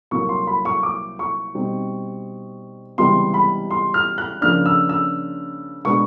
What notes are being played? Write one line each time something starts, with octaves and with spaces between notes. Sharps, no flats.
C2 A#2 F#3 A#3 C#6
C6
B5
C#6
D6
C#6
B2 G3 C4 D#4
C#2 C3 E3 G3 B3 C6
B5
C6
F6
F#6
C#3 F3 A#3 D4 F6
E6
E6
B2 G#3 B3 D4 C#6